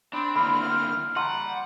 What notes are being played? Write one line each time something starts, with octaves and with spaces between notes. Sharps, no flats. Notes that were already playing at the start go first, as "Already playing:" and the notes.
C4 D4 B5
D3 A#3 E4 B5 F6
G3 F#5 A5 A#5 C6